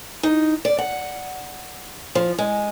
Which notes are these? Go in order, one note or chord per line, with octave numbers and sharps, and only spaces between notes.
D#4
D5
F#5
F3
G#3